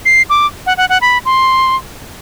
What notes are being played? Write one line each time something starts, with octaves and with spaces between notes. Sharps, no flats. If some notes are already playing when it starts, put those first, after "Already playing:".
C7
D6
F#5
F#5
F#5
B5
C6